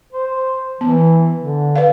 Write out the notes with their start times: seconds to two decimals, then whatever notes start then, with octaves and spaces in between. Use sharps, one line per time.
0.13 C5
0.81 E3 B3
1.39 D3
1.75 B4 D5 F5